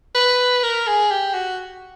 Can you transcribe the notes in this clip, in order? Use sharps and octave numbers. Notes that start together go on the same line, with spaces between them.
B4
A#4
G#4
G4
F#4